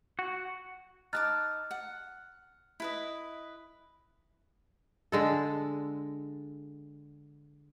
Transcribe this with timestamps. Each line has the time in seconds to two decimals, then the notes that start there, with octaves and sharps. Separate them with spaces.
0.19 F#4
1.13 D#4 A5 D6 F6 F#6 A6
1.71 F#5
2.80 E4 B4 D#5
5.12 D3 G#3 A4